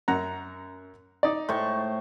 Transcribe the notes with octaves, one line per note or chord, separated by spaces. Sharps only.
F#2 F#5 A#5
D#4 D5
A2 C5 C#6